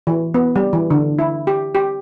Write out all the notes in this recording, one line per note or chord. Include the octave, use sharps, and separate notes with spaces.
E3
B3
G3
E3
D3
E4
G4
G4